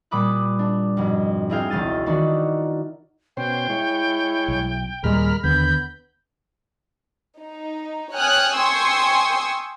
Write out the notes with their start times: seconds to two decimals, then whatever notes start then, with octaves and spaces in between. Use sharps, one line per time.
0.11 A#2 G3 B5 D6 D#6 F#6
0.59 D4
0.97 F2 G#2 B2
1.49 C4 E4 G#4 E5 F5 G5
1.70 E1 C#2 F5 A6 D#7
2.06 D#3 E3 D4 D#4 F#4
3.37 B2 C#4 C5 G5
3.69 G#3 E4 C#5
4.48 B1
5.04 D#2 A#2 G3 G#3 A#4 B5 F6
5.44 D#2 D3 B3 B5 G6
7.40 D#4
8.14 C#5 G5 G#5 D#6 F6 F#6
8.57 G5 G#5 C6 C#6 D#6 E6